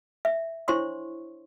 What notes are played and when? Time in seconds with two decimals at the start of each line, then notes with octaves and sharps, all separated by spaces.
0.25 E5
0.68 D4 E4 C5 C#5 C6 C#6